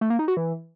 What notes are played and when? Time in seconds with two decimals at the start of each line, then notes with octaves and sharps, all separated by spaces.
0.01 A3
0.10 A#3
0.19 D#4
0.28 F#4
0.37 E3